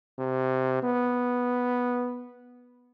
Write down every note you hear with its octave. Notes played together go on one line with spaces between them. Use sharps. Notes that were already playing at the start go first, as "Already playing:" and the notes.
C3
B3